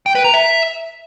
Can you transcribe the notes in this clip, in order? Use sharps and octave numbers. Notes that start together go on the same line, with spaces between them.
G5
B4
A#5
E5